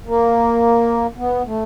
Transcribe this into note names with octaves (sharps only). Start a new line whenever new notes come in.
A#3
B3
A3